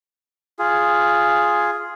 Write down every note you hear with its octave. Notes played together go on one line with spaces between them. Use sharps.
F4 G#4